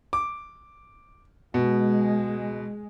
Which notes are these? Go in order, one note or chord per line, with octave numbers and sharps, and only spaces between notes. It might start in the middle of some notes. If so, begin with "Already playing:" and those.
D6
B2 G#3